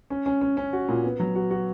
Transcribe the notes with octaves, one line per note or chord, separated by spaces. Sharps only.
C#4
C#4
C#4
C#4
F#4
A#2
B3
F#3
F#4
F#4